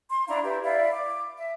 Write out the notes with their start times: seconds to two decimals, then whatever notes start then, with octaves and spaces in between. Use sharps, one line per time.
0.11 C6
0.27 D4 E4 F5 A#5
0.44 E4 G4 B4
0.63 E4 D5 E5 F5
0.93 D6
1.39 E5